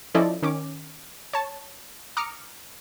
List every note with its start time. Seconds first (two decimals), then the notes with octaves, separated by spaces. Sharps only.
0.15 F3 C#4 E4 A4 D5 D#5
0.43 D#3 C#4 D6
1.33 C#5 A5
2.17 A#5 D6 D#6 F6 C#7